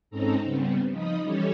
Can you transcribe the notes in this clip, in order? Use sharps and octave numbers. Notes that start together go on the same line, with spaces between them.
G#2 C4 C#4 D#4 A4 A#5
C#3 G3 B3 C4
F3 D#4 D#5 B5 D#6
E3 G3 C#4 G4 A4 C#5